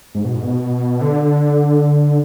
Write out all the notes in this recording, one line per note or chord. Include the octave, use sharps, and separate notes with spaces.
G#2
B2
G#2
B2
D3